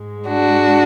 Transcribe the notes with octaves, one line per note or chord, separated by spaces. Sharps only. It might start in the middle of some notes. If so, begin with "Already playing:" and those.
Already playing: G#2 G#3
D4 F#4